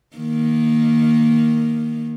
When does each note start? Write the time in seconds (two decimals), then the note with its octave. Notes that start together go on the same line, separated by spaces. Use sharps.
0.17 D#3 A#3